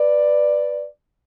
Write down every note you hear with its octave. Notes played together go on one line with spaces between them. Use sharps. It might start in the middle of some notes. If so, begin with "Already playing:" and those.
Already playing: B4 D5